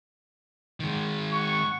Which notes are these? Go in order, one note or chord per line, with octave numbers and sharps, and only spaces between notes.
D#3 G#3
F#5 C#6